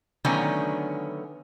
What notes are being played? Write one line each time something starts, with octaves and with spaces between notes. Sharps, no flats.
D3 D#3 F#3 A3 B3 C#4